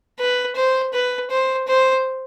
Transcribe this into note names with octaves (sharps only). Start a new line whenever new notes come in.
B4
C5
B4
C5
C5